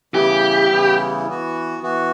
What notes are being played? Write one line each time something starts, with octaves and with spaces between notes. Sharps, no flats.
C#3 E3 G3 B3 E4 G4
C#3 E3 G3 B3 E4
E3 B3 F#4
E3 B3 F#4